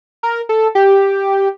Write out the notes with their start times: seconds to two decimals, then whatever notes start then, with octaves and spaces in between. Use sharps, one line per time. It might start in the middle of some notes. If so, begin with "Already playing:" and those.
0.23 A#4
0.49 A4
0.75 G4